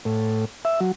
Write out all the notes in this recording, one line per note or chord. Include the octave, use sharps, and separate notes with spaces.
A2
E5
F#3